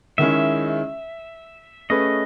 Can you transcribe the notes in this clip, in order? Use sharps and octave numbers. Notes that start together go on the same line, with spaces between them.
D#3 G#3 C#4 E4 G#4 E5
A3 C#4 G#4 B4 D#5